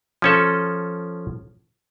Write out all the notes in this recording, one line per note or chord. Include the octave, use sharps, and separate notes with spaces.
F3 C#4 A4